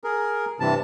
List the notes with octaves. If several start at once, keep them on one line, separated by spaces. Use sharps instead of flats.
G#4 A#4
G2 C3 E3 A5